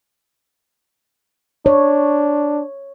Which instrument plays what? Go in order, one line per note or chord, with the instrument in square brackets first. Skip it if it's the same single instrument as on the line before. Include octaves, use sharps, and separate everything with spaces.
[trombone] D4 [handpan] C#5